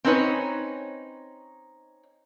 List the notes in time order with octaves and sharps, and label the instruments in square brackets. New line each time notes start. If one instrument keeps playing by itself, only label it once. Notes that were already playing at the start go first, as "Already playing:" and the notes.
[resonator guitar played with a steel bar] C4 C#4 D#4 B4 C#5